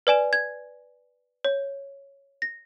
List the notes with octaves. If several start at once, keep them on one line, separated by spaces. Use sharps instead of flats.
B4 D5 G#5 E7
G#6
C#5
A#6